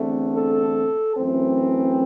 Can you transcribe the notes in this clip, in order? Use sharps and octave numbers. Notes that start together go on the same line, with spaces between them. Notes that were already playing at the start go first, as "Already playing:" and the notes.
Already playing: E2 D3 A3 C4
A4
F#2 E3 A3 C4